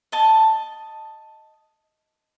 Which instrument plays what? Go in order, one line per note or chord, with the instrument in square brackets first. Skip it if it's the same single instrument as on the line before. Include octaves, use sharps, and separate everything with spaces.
[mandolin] D#5 A5